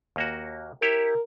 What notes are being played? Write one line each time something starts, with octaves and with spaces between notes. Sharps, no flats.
D#2 A#3 F#4
E4 G4 A#4 C#5